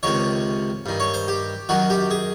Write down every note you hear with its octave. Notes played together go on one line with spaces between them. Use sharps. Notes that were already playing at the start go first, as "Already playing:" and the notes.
C#2 C3 D#3 C#5
G2 D#3
C#5
C5
G4
F#2 D#3 F#4
G4
G#4